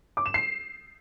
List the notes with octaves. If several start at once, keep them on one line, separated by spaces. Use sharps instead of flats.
D6
E7
C7